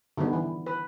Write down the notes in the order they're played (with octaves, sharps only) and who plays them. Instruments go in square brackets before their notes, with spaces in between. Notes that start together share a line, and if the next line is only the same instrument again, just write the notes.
[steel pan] D3 D#3 G3 B3
E3
B4